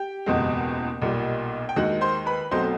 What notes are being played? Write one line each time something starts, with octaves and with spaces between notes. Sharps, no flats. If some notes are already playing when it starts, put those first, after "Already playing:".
Already playing: G4 G5
F#1 E2 B2 G#3 C4
B1 A#2 G3
G5
D#2 D#3 G#3 F#4 F#5
C5 C6
B4 B5
B1 B2 F#3 A3 C4 C5 C6